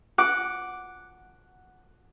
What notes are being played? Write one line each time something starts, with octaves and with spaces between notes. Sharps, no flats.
F#5 D6